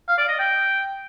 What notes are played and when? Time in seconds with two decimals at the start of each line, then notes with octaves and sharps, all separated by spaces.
0.08 F5
0.18 D5
0.28 D#5
0.39 G5